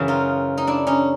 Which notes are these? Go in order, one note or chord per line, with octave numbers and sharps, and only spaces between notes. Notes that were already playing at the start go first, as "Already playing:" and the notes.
Already playing: F#2 C#3 E3
D#4 F4
D#4
D4 E4
C#4 D#4